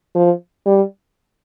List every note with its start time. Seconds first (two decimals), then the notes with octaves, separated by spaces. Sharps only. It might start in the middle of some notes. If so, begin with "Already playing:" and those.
0.15 F3
0.66 G3